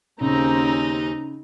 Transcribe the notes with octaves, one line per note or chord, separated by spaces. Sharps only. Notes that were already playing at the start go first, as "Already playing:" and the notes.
D#2 C#3 C4 C#4 D#4 A#5